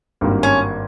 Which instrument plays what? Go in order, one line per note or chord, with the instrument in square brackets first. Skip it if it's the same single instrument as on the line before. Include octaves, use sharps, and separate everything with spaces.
[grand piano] G#1 G2 D#3 G3 A#3
[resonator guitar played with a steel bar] C#4